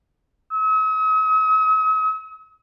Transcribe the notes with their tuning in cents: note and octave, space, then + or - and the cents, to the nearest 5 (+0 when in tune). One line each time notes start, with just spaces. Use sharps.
D#6 +45